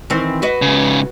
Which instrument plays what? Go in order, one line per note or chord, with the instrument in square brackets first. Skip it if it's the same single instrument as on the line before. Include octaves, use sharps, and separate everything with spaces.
[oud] D#3 E3 C4
F#4 B4 D#5
[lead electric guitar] G#2 C#3